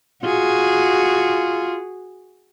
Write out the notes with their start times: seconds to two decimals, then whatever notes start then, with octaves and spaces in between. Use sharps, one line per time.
0.23 F4 F#4 G#4